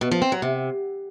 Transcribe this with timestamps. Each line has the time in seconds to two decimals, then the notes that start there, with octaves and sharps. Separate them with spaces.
0.01 B2
0.12 F3
0.22 C4
0.32 F#3
0.42 C3